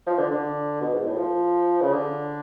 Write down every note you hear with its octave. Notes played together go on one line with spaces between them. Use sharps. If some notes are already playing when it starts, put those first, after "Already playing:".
F3
D3
D3
B2
G#2
A2
F3
C#3
D3